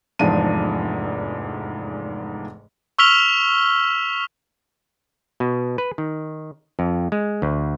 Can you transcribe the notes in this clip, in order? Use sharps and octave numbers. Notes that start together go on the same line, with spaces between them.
F1 E2 G#2 F3 D4 D#7
C#6 E6 F6 B6 F7 G7
B2
B4
D#3
F2
G#3
D2